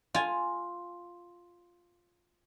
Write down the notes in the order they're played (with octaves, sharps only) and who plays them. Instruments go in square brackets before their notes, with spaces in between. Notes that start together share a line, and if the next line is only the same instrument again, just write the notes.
[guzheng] F4 G#5